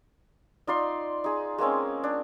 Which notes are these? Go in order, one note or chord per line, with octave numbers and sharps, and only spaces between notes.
D#4 F4 D5 C6
D#4 G#4
G#3 A#3 C4 C#4
D4